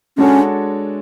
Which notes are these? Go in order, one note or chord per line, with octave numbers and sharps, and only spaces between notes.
G#3 C#4 D4 F#4 A4 C#5